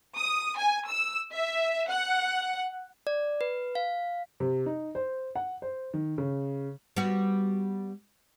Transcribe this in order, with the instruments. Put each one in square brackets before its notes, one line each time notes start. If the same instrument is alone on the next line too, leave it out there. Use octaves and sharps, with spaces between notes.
[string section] D#6
G#5
E6
E5
F#5
[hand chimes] D5
B4
F5
[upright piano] C3
D#4
C5
F#5
C5
D#3
C#3
[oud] G3 B3 F#4